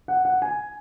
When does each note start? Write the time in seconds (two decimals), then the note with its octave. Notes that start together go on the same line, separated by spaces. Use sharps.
0.08 F#5
0.25 F#5
0.42 G#5